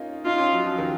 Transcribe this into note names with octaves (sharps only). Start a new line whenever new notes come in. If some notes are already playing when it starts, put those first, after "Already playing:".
Already playing: A#3 C#4 D#4 F4
D#4 F4
C#4
F#3
F3
D#3